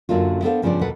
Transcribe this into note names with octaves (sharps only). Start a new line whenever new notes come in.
F#2 D3 F#3 A#3 D4 F4
B3 D4 A4 C5 D#5 F5
G2 C#3 F3 C#4 D4 D5
D#2 B2 A4 B4 F#5